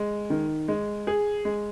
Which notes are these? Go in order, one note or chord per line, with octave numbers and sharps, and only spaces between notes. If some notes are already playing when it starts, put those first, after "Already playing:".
Already playing: G#3
D#3
G#3
G#4
G#3